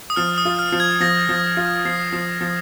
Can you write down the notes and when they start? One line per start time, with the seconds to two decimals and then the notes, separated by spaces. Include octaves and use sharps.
0.10 D#6
0.16 F3 F6
0.38 D#6
0.45 F4
0.59 F6
0.72 F3
0.80 G#6
1.00 F3 A#6
1.29 F3
1.57 F4
1.85 F3 C7
2.13 F3
2.41 F3